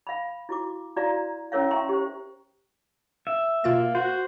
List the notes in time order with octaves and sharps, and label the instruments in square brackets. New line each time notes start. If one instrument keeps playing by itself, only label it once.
[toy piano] F5 B5
E4 F#4 D6
E4 F#4 D5 F5 A#5
C#4 E4 A#4 C#5 F5
E5 G5 A#5 C6 C#6
G4 C5
[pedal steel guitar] E5
[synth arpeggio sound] B2 F4 A6 [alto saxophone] A#3
[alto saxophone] F#4 [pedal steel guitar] C5